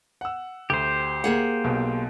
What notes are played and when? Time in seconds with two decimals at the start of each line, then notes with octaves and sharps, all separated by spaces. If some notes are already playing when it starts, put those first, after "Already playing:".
0.21 F#5 E6
0.70 D2 G4 C5
1.24 A#3 G#4 F#5
1.64 B1 B2